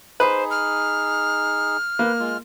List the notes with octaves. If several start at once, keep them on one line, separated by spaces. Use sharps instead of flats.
D#4 G#4 B4 C5
F6
A#3 B4
G#3 F4